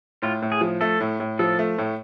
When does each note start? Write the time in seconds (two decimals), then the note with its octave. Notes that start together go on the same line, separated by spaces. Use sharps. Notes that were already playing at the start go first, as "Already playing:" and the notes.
0.22 A2 F4
0.42 A2
0.52 G#4
0.61 F3
0.81 A3 A4
1.01 A2
1.20 A2
1.39 F3 A4
1.59 A3
1.78 A2